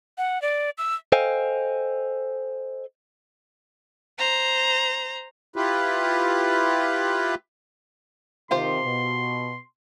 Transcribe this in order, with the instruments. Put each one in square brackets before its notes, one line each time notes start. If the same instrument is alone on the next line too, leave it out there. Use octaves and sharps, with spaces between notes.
[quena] F#5
D5
E6
[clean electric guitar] A4 C5 D#5 F5 G5 G#5
[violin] C5 A#5
[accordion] E4 F4 G4 B4
[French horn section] C3 D#3 [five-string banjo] F4 G4 C5 [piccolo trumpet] C6
[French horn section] B2